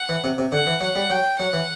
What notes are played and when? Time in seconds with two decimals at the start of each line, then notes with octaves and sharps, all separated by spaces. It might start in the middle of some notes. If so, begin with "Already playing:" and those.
Already playing: F#5
0.09 E3
0.24 C3
0.38 C3
0.52 D3 F#5
0.67 E3
0.81 F#3 F#5
0.96 G3
1.10 F#3 G5
1.39 F#3 F#5
1.53 E3